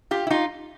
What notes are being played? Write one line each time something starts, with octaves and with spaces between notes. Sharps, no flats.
F4 G4
E4
D#4 F4